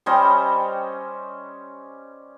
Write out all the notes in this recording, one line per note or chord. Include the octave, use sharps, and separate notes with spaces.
G3 C#4 C5 D#5